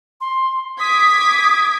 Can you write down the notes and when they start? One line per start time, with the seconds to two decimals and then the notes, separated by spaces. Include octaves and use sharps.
0.20 C6
0.79 D6 D#6 G#6 B6